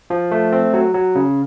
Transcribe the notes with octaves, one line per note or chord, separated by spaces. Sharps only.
F3
A3
C4
F#3
F#3
C#3